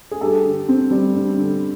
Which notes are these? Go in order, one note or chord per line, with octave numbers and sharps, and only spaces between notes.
G#4
G2 G4 A4
D3
C4
G3
G2
D3